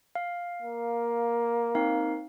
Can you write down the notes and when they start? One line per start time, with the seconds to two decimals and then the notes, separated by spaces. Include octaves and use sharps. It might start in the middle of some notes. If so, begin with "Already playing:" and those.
0.15 F5
0.62 A#3
1.75 C4 D#4 F5